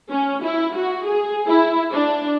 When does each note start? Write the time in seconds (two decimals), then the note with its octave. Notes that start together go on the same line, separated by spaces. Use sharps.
0.11 C#4
0.43 E4
0.74 F#4
1.06 G#4
1.47 E4
1.93 D4